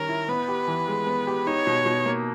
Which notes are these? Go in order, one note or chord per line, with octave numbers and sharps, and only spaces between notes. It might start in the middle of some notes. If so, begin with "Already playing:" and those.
Already playing: D#3 G3 C#4 A#4
E4
B3 B4
G4
E3
G#3
B3
G4
D#4 C#5
B2
B2
A#3